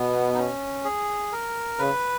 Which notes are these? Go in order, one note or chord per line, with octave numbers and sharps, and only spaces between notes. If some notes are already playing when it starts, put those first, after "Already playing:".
Already playing: B2 B3
D#4
C#4
G#4
A#4
C#3 B4